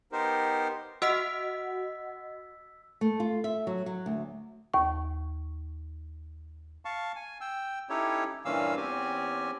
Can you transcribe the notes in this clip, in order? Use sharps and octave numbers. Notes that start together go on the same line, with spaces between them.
B3 D#4 G4 A#4 C5
F#4 D#5 F#5 E6 B6
A3
F4
E5
F#3
F#3
D2
D#2 C#6
F5 A5 C#6
G#5
G5 E6
C#4 D#4 E4 G4 A4 C#5
G2 A#2 E3 C#4 F5 E6
E2 C4 C#4 G4 G#5